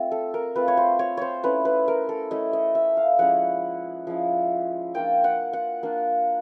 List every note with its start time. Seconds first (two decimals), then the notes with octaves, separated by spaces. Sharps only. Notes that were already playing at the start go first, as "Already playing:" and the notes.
Already playing: A3 C4 F4
0.12 A4
0.34 A#4
0.55 A3 C4 F4 B4
0.68 C#5
0.77 C5
0.99 C#5
1.17 C5 C#5
1.43 A3 C#4 E4 B4
1.65 B4
1.88 A#4
2.09 A4
2.31 A3 C#4 E4 D#5
2.53 D#5
2.75 E5
2.97 F5
3.19 F3 G#3 C#4 E4 F#5
4.07 F3 G#3 C#4 E4
4.94 A#3 D4 F4 G5
5.24 F#5
5.53 F#5
5.83 A#3 D4 F4